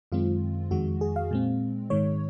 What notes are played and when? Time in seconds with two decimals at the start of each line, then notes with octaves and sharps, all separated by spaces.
0.12 F#2 D#3 G#3 C4 F4
0.71 F2 D#3 G#3 F#4
1.01 G#4
1.16 F5
1.31 A#2 G#3 C4
1.90 G#2 D#3 G#3 C#5